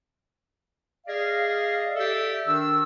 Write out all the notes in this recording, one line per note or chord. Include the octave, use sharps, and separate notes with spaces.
G#4 D5 D#5 F5
G4 A4 D5 E5
D#3 D4 E6